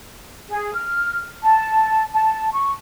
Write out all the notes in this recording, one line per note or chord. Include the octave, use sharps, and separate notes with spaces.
G#4
F6
A5
A5
C#6